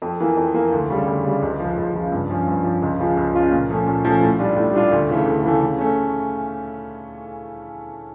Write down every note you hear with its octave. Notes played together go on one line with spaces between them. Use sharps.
F2
E3 A#3
F2
E3 A#3
D2
C#3 G3
D2
C#3 G3
C#2
C#3 F3
C#2
C#3 F3
G2
F3 C#4
G2
F3 C#4
C#2
C#3 F3 C#4 F4
C#2
C#3 F3 C#4 F4
A#2
F3 A3 C#4
A#2
F3 A3 C#4
A2
G3 D4 F4
A2
G3 D4 F4
D2
C#3 E3 A3
D2
C#3 E3 A3
C#3
A3 C#4